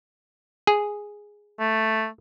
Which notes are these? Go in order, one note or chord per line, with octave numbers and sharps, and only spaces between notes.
G#4
A3